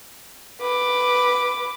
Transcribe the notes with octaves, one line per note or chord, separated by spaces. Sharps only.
B4 D6